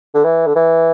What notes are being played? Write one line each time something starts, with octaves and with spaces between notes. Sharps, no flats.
D3
E3
D3
E3